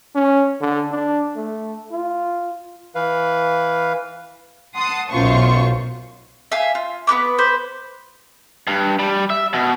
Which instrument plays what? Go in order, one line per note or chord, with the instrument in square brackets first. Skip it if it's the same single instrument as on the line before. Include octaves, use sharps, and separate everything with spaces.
[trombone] C#4
D3
D4
A3
F4
[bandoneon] E3 B4 F5
[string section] F#5 A5 C6 D#6 C7
B1 F#2 B2 F4 C5 C#6
[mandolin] E5 F5 G#5
F4
B3 C#4 B4 D6
B4 C5
[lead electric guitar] G2
G3
E5
B2